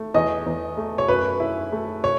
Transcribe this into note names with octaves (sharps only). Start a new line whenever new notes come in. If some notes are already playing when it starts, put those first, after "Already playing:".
Already playing: A3
E2 D#5
E2
A3
C#5
F#2 B4
E4
A3
C#5